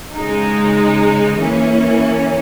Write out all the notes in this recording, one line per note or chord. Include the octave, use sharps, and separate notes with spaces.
C#3 G#3 D#4
E3 A#3 C#4